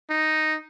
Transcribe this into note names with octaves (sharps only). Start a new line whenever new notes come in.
D#4